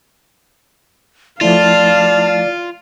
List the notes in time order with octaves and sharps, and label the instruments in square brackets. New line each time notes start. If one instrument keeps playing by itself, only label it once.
[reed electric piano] F3 A3 E4 [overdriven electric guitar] F4 [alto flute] D5 [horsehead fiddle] F5 A5